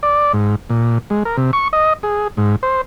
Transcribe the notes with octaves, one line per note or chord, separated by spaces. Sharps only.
D5
G#2
A#2
G#3
A#4
C3
C#6
D#5
G#4
G#2
C5